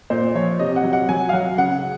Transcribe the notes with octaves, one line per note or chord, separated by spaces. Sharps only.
A#2 C5
F3 C#5
C3 D#5
F#5
F#3
F#5
F#3 G#5
F5
F#3 F#5
C#3 F#5